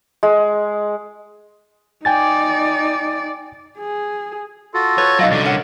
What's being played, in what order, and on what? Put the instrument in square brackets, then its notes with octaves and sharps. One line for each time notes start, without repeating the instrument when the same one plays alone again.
[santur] G#3
[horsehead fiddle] D#4 D5 [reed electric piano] G5 G#5 A6
[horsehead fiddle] G#4
[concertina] F4 F#4 A4
[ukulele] B4 [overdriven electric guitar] C#5
[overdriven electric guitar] F#3 D#4 [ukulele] D#5 F5 F#5
[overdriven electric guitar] C2 D3 [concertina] F#4 D5
[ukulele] A#4 F#5 [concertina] C#5